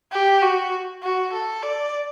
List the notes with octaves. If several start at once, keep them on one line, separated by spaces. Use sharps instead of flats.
G4
F#4
F#4
A4
D5